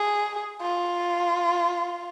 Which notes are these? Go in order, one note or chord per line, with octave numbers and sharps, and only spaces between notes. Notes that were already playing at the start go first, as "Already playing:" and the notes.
Already playing: G#4
F4